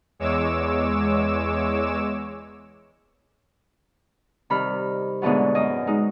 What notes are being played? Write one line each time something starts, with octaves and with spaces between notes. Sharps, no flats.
E2 G#3 C#5 D6 E6 E7
C3 D#3 G3 B5 F6
G#2 B2 D3 E3 F#3
F#2 D#5
G#3 D#4